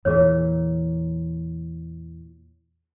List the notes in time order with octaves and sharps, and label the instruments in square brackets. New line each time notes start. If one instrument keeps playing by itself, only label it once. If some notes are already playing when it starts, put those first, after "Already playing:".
[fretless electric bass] E2 A#2 E3 [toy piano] G#4 C#5